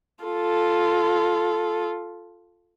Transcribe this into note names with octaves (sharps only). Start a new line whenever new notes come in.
F4 A4